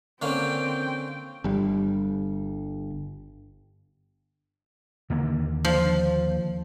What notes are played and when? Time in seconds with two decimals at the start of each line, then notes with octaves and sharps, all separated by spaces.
0.22 D3 A#3 C4 C#4 G5
1.44 G1 G3
5.10 D#2 D3 A#3
5.65 F3